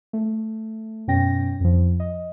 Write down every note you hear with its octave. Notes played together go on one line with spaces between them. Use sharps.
A3
F#2 B2 C#4 G5 A#6
F2 F3
D#5